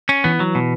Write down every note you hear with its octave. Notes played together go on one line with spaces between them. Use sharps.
C#4
E3 B3
F#3
B2